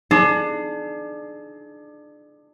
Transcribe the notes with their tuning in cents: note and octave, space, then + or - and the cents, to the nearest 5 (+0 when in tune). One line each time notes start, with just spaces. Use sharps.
D4 +25 G#4 +40